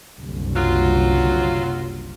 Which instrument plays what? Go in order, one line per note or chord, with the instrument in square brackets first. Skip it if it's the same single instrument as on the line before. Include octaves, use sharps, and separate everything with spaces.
[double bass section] F#1 C2 D3
[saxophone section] F#3 F4